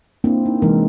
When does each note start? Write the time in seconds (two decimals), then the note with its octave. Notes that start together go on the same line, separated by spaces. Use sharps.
0.24 A#3 C4 D4 E4
0.45 D#4
0.62 C3 E3 G#3 A#3 D#4 A#4